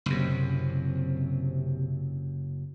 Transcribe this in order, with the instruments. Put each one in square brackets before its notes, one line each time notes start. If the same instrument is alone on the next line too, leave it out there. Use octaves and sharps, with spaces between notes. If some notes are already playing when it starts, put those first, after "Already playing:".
[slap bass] F#1 F#2 [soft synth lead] C3